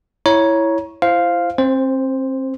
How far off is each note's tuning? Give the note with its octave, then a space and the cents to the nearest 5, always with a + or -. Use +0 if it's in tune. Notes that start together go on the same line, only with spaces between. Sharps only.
E4 +0 C#5 +0 A#5 +25
E4 +30 C5 +0 F5 +0
C4 +30 C5 +0